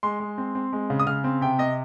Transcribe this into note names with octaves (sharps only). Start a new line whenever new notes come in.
G#3 C6
G#3
C4
C4
G#3
C#3
D#6
C#3 F6
C4
C3 G5
C3 D#5